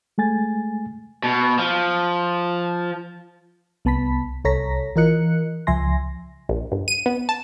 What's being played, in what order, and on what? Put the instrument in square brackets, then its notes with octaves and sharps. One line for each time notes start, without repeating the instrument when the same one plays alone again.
[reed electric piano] G#3 A3 G#5 A6
[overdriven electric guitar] B2
F3
[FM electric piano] C2 B3 A5 B5 B6
C2 A4 C#5 A#5 A#6 B6
E3 F4 A#4 D#5 F#6 C#7
C#2 F3 E5 G#5 C6 A#6
[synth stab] A#1
G1
D#7
B3
A5